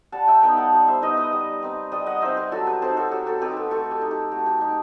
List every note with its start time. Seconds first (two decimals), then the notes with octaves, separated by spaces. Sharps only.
0.12 G3 F#5 A5
0.27 E5 G5
0.42 B3 D#4 G5 B5
0.57 F#5 A5
0.73 G3
0.88 C5 E5
1.02 B3 D#4 B4 D#5
1.17 B4 D#5
1.32 G3
1.63 C4 D#4
1.92 G3 B4 D#5
2.06 D#5 F#5
2.22 C4 D#4 C5 E5
2.37 G4 B4
2.52 F#3 F#4 A4
2.67 G4 B4
2.82 C4 D#4 A4 C5
2.97 F#4 A4
3.11 F#3 G4
3.26 F#4 A4
3.41 C4 D#4 G4 B4
3.57 F#4 A4
3.71 A3 F#4 A4
3.91 G4
4.02 D#4
4.11 G4
4.32 A3 F#4
4.46 G4
4.61 D#4 G4